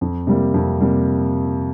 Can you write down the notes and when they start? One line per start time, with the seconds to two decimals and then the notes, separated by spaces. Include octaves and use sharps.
0.01 F2
0.27 C3 G3 A#3
0.54 F2
0.81 C3 G3 A#3